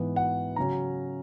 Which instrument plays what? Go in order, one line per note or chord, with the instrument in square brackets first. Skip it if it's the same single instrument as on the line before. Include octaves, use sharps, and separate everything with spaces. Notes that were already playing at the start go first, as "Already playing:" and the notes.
Already playing: [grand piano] G#2 E3 B3
F#5
C#3 F#3 C#4 A#5